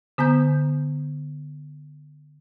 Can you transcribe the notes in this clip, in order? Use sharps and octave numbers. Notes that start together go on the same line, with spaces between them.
D3 B3 A#5 G6